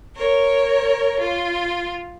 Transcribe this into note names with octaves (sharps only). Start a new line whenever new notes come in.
A#4 C#5
F4